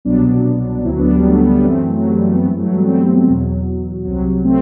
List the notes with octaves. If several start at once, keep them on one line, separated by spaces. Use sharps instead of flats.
C2 B2 F#3 B3 D4
D2 D3 F#3 C4 E4
B3 D4
G3 B3
F#3 A3
G3 B3
G3 B3
F#2 E3 A3 C4
F#3
G3
A3
B3
G2 E3 A3 C4
F#3 A3
G3 B3
A3 C4
E2 B2 F#3
C2 C3 F#3
A3 C4